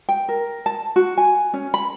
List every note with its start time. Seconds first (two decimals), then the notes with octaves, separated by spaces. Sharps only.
0.09 G5
0.29 A#4
0.66 A5
0.96 F#4
1.18 G#5
1.53 C#4
1.74 B5